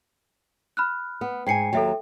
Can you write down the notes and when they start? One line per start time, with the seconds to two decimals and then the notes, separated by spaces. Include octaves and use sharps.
0.77 B5 F6 F#6
1.21 B3
1.47 G#2 G5 G#5 C7 C#7
1.73 D#2 F#3 A4 E5 G5